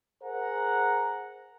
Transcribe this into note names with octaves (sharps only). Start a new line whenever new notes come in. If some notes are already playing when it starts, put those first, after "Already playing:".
G#4 A#4 C5 F#5 A#5